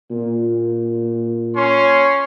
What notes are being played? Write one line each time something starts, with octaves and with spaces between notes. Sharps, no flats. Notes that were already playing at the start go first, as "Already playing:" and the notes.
A#2
C#4 C#5 C6